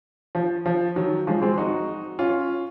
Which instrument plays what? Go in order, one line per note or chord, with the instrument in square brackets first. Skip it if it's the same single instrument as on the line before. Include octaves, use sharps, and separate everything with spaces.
[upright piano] F3
F3
D#3 F#3
F3 G#3
G#3 C4
D#4 F#4
C#4 F4